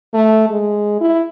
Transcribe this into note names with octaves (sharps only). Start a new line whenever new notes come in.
A3
G#3
E4